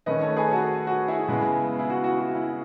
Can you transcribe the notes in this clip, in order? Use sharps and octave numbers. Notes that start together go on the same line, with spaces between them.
D#3 A3 C#4 B4 D#5
A4 C#5
G#4 B4
F#4 A4
F#4
E4 G#4
C#3 G#3 B3
E4
F#4
F#4
F#4
E4